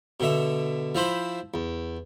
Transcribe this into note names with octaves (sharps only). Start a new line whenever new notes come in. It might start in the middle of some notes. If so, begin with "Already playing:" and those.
B2 D3 E5
F3 E4 C5 B5
E2